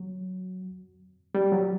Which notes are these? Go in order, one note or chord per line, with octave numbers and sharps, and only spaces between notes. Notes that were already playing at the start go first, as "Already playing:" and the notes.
Already playing: F#3
G3
F#3